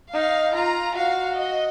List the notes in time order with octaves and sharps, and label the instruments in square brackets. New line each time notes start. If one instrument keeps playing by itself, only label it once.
[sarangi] D#4 [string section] F5
[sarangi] F4 [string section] A#5
[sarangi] F#4 [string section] F5
[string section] D#5